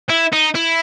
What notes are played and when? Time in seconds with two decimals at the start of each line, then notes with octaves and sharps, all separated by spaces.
0.09 E4
0.33 D#4
0.55 E4